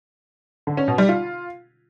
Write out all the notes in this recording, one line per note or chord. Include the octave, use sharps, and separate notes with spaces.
D3
C#4
B2
G3
F4